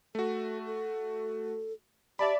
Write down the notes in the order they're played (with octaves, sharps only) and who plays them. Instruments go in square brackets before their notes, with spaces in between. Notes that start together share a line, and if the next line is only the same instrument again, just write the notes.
[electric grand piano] A3 F#4 [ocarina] A4
[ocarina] A4
[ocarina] G4 [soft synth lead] D5 [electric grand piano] E5 A5 B5